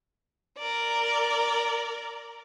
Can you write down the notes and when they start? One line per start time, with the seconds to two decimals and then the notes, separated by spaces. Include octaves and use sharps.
0.58 A#4 D5